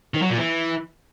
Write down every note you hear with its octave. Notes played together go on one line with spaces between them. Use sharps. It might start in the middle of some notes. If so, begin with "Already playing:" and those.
D#3
F#3
A#2
E3